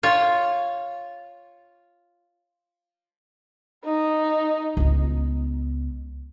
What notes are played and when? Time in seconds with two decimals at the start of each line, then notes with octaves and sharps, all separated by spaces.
0.03 F4 C#5
3.85 D#4
4.77 C#2 B3